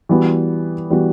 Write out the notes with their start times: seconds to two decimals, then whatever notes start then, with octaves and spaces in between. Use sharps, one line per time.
0.09 E3 G3 B3 F#4
0.90 E3 G3 B3 F#4